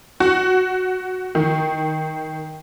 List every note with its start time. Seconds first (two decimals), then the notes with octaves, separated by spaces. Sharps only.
0.20 F#4
1.35 D#3